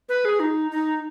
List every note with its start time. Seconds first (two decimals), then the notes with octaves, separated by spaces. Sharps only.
0.09 B4
0.25 G#4
0.40 D#4
0.71 D#4